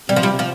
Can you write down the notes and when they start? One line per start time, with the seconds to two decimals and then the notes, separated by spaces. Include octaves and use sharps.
0.09 C3 G3
0.16 F3
0.23 G3
0.39 F3